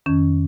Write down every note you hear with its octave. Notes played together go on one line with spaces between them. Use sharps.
F2 D#3 C#4